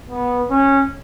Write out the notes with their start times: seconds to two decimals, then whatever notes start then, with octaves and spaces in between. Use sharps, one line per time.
0.10 B3
0.50 C#4